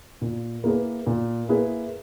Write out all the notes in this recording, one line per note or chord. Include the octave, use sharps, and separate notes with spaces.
A#2
A#3 E4 G#4 B4
A#2
A#3 E4 G#4 B4